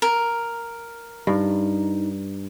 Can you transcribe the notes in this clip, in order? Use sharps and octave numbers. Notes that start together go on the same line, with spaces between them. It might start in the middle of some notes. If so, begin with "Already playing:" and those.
A#4
G2 D#4